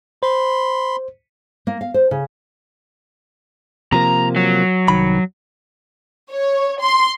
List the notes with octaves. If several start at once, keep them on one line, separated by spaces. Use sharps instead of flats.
C5 B5 C6
A#3
F5
C5
C#3
C3 F3 A#3 A#5
F#3
C2 D#3 B5
C#5
C6